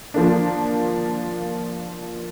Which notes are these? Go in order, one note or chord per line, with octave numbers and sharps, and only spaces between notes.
F3 A#3 D4